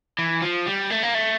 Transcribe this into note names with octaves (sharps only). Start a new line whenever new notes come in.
E3
F3
G3
A3
A#3
A3